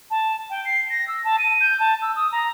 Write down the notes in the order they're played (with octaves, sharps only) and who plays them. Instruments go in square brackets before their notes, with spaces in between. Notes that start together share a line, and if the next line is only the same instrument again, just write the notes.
[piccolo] A5
G5
C7
A#6
E6
A5
D#7
G6
A5
E6
D#6
A#5